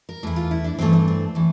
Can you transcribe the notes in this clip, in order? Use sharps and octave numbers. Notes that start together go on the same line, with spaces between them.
A#4
E2 E3 A3 E4
F4
E4
D4
G2 E3 A3 C4
D4
C4
E3 A3